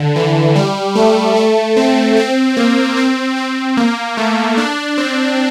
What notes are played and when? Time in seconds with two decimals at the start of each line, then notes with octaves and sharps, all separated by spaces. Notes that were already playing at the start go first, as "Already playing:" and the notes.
Already playing: D3
0.16 E3
0.56 G3
0.95 A3
1.36 A3
1.76 C4
2.16 C4
2.57 A#3
2.97 C4
3.36 C4
3.77 A#3
4.17 A3
4.57 D4
4.98 C4